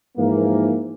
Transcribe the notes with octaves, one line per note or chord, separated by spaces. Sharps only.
G#2 E3 F3 A#3